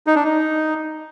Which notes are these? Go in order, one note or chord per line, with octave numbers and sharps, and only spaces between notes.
D#4
D4
D#4